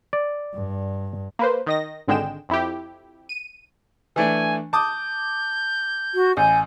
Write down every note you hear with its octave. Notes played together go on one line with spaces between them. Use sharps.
D5
G2
A#3 B4 C5
D#3 D#5 A#6
G#1 D3 G#3 G5 E7
F2 E4 G4
D#7
E3 A3 D4 G#5
A5 D6 D#6 G6
F#4
A1 G#5 G6